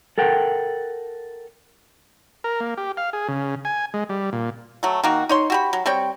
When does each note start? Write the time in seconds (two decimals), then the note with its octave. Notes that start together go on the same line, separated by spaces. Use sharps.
0.18 A4 A#4 F#5 G5
2.44 A#4
2.60 A#3
2.77 G4
2.97 F5
3.13 G#4
3.28 C#3
3.65 G#5
3.94 G#3
4.09 G3
4.33 A#2
4.83 F#3 A3
5.04 D#3 A#3 F#4
5.29 D#4 C#5 C6
5.50 F#4 G4 B5
5.73 F#3
5.86 G3 C4 C#5 G5